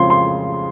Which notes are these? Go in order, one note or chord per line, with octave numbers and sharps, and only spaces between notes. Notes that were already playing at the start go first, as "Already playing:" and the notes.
Already playing: F2 C#3 F3 G#3 C4 C6
C6